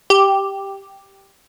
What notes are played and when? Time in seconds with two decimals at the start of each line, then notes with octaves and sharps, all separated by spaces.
0.10 G4